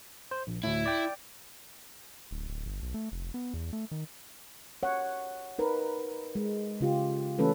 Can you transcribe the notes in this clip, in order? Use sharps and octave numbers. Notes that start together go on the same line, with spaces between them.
C5
A#1
D2 A2 E4
D5 G5
D1
D1
G1
B1
A3
F1
B3
E2
A3
D#3
C#5 F#5
D#4 A#4 B4
G#3
C#3 F4 G4
E3 A3 C#4 A4 B4